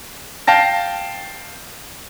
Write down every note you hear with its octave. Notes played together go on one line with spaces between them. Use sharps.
F5 G5 A5 A#6